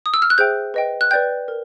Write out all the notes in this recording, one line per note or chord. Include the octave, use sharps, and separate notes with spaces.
D#6
E6
F6
F#6
G#4 C5 E5 G5 G6
B4 D#5 G5
F#6
B4 D5 G5 G6
A#4